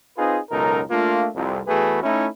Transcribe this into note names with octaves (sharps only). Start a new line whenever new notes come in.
C4 D#4 F4 G#4 B4
C#2 F#2 B2 D#4 A4 A#4
A3 A#3 D4 F4
C2 F2
E2 A3 F#4 G#4 B4
A3 C#4 D#4 E4